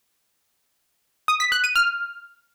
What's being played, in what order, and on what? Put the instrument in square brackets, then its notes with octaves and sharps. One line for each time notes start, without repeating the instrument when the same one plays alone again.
[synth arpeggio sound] D#6
B6
F#6
D#7
F6